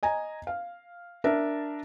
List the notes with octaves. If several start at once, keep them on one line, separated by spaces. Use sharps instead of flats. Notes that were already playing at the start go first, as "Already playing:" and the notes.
D#5 G#5 A#5
F5
D4 A#4 E5 A5